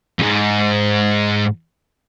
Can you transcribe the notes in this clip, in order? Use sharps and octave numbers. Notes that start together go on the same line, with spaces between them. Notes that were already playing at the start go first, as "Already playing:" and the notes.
F2 G#2